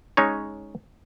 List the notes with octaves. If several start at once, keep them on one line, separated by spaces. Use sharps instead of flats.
G#3 C#4 D#4 C#5